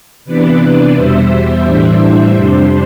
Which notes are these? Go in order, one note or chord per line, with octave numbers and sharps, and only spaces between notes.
C3 E3 B3 D4 B4 D5
E2 B2 G3 C5 E5
A2 E3 G3 D4
F2 C3 G3 D4 C5